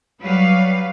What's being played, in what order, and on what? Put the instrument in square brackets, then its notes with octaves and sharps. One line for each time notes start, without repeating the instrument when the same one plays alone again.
[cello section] F#3 G3 B4 F5